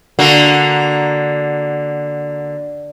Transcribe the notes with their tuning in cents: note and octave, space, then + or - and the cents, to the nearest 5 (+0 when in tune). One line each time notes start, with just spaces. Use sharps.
D3 +0 A#3 +0 F#4 +0